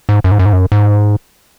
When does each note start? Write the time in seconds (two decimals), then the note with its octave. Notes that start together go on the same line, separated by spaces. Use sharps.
0.09 G#2
0.24 F#2
0.31 G#2
0.39 F#2
0.46 G#2
0.53 F#2
0.72 G#2